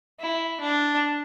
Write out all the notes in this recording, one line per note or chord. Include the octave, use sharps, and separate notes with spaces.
E4
D4